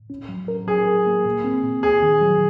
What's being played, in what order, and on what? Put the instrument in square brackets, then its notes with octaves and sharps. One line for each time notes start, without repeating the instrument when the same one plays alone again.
[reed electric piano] C#4
F#3
A#4
[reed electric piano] F#3 [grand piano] G#4
[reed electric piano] A#4
A#3
A#2
C4
A#2
[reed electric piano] D#2 [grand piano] G#4
[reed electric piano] D#3
F#3